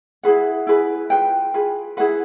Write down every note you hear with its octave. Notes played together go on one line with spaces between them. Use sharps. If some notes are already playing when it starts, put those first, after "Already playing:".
E4 G#4 B4 F#5
E4 G#4 B4
F4 G#4 B4 G5
F4 G#4 B4
E4 G#4 B4 F#5